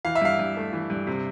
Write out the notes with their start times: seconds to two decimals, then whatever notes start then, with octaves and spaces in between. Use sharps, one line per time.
0.05 E3 F5
0.15 E5
0.21 G2 F5
0.39 G2
0.57 A3
0.73 E3
0.90 G2
1.07 C3